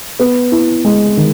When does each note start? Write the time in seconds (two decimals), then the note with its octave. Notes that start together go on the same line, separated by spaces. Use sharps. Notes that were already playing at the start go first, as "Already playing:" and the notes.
0.20 B3
0.52 E4
0.85 G#3
1.17 D#3